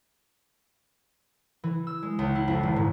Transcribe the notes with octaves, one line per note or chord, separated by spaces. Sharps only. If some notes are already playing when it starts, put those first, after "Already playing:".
E3
E6
G#3
C#2
E4
F2
D#1
G#2